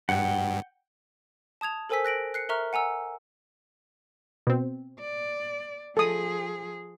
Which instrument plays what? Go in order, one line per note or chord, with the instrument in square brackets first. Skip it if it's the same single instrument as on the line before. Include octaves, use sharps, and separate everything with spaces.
[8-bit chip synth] G2 [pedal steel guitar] F#5 G5
[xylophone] A5 D#6 G#6 F7
A4 A#4 C5 G#5 E6 B6
F#6 A#6 D7 F#7
F#6 C7 C#7
A#4 E5 A#5 C#6 F6 F#6
F#5 G#5 A#5 E6
[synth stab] B2 C4
[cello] D5
[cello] F3 G#4 [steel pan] A4 D#6